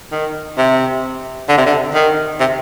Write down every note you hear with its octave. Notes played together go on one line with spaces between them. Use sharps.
D#3
C3
D3
C3
D3
D#3
C3